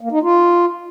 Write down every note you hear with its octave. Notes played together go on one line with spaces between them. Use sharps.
A#3
D#4
F4